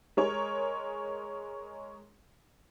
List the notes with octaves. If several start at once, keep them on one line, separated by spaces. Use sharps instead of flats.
G#3 A#4 C#5